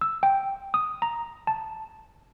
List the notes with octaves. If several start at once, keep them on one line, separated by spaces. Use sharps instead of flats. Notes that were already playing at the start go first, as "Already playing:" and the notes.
E6
G5
D#6
A#5
A5